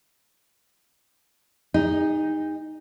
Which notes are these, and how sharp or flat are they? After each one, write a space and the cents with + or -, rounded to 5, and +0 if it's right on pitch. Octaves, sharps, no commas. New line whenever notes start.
D#4 +0 G#4 -45